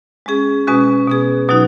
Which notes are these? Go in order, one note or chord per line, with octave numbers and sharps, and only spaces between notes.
G#3 C#4 G#4
B2 G#3 C#4 F#4
B2 B3 G#4
B2 F#3 D#4 F#4